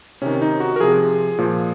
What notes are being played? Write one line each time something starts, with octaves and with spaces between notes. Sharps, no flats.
C3 D#3 C#4
D#4
F#4
A#4
C3 F3 G#4
A#2 F3